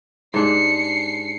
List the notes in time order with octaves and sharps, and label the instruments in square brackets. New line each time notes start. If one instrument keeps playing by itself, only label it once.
[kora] G#2 D4 G4 [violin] C7 C#7